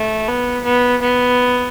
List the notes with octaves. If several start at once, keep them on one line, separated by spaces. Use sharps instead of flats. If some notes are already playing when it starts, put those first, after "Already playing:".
Already playing: A3
B3
B3
B3